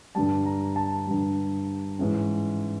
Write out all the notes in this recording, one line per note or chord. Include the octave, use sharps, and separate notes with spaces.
G2 D3 G3 A5
A#5
A5
G2 D3 G3
G#2 E3 G#3 C#4